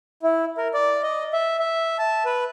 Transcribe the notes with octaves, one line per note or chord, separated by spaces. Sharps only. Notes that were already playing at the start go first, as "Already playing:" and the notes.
E4
A#4
D5
D#5
E5
E5
A5
B4